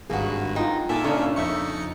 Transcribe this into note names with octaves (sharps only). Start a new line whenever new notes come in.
G#1 G2 A#3 F#4 G#4
D#4 F4 G5
A#2 A#3 D#4 A4 E5 G#5 A5
C#3 C#4 D4 A4 C#5 C#6
F2 D#4 E5 C#6 C#7